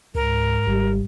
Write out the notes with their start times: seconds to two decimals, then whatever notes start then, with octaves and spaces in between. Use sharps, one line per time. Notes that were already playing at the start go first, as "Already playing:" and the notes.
0.15 C#2 G#2 A#4
0.67 G#1 G3